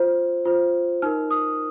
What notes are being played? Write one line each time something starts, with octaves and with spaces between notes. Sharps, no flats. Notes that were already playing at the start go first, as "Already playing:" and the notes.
Already playing: F4 C5
F4 C5
D#4 A#4 F6
D#6